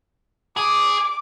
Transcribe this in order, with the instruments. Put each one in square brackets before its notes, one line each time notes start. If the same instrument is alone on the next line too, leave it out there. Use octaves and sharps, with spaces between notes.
[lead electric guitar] G#4 [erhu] D6